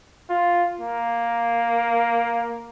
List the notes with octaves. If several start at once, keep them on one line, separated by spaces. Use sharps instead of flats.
F4
A#3